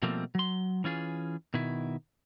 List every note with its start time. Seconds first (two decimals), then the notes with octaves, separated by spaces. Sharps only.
0.03 B2 F3 G3 A3 A#3 C4
0.35 F#3 C6
0.84 E3 C#4 F4 G#4
1.54 B2 D#3 E4